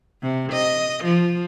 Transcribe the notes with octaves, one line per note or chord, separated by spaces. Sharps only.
C3
D#5
F3